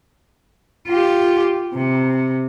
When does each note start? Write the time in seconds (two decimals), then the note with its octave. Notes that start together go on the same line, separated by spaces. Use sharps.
0.87 F4 G4
1.74 C3